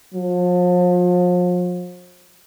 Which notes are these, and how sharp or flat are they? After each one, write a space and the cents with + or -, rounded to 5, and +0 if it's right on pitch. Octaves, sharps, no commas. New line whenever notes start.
F3 +40